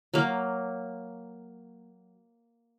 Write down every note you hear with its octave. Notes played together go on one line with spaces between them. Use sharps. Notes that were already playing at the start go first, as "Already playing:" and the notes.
F#3 A#3